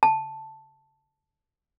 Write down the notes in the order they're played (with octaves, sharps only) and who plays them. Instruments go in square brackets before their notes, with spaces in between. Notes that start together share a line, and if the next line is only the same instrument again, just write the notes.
[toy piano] A5